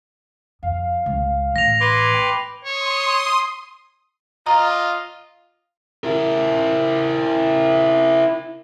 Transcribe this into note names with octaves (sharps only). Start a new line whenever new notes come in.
F2 F5
C#2
A1 A#6 F7
B4 C6 D6 G#6
G5
C#5 C6 D#6
F4 D#5 A#5
E4 A#4